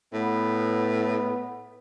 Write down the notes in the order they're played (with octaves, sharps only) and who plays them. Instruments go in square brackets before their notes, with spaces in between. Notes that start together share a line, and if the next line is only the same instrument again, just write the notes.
[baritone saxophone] A2 [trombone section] B3